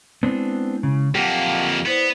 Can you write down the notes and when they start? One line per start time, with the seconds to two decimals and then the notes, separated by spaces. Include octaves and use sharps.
0.23 G#3 B3 C4 D4 E4
0.83 C#3
1.15 F2 F#3 A#3 G4 F#5 A5
1.86 B3 E4 C5 D5